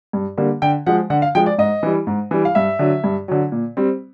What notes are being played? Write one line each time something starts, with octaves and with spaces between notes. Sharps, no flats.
G2
D3 G3 A#3
D3 G5
F3 G#3 F#5
D3 F#5
F5
F3 G#3 G5
D5
G#2 D#5
E3 G3
G#2
E3 G3
F5
G2 E5
D3 F#3
G2
D3 F#3
A#2
G3 C4